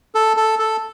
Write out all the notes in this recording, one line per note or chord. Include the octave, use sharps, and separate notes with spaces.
A4
A4
A4